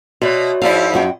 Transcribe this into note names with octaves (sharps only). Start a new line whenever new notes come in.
B2 F#4 C#5 D5 E5
G#2 F3 E4 D5 F5
F#2 F#4 G5